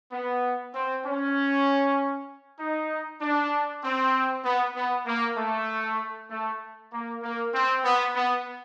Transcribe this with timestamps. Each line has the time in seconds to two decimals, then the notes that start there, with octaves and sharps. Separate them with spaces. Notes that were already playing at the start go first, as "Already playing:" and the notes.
0.12 B3
0.75 C4
1.06 C#4
2.60 D#4
3.22 D4
3.83 C4
4.45 B3
4.76 B3
5.07 A#3
5.37 A3
6.31 A3
6.92 A#3
7.23 A#3
7.54 C4
7.84 B3
8.16 B3